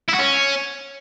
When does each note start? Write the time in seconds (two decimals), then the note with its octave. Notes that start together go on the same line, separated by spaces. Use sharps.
0.09 E4
0.14 F#4
0.19 C#4